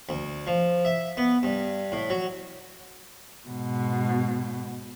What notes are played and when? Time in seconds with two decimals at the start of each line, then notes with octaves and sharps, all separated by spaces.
0.09 D2
0.47 F3
0.85 E5
1.17 B3
1.43 G2
1.92 A2
2.10 F#3
3.49 G#2 B2